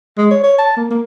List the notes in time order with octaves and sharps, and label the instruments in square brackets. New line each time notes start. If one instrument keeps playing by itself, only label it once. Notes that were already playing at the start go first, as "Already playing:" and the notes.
[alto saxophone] G#3
C#5
C#5
A5
A#3
A#3